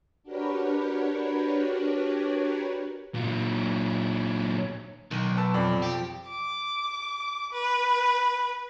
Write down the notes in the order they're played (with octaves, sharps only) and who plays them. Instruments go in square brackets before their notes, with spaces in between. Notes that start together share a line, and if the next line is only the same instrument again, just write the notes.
[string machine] D4 F#4 G4 A#4 B4 C#5
[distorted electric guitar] A#2 F#3
[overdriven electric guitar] B1 [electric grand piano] D#3
[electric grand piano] B4 A5 E6
F2 D5 D6
[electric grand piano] F3 [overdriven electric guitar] G4
[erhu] D6
B4